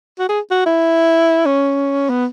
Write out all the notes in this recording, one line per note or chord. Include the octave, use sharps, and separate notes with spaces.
F#4
G#4
F#4
E4
C#4
B3